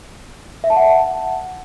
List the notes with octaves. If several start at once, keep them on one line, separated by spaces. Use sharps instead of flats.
E5
A5
F#5